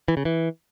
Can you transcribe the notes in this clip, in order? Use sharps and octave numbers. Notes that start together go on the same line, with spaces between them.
E3
C#3
E3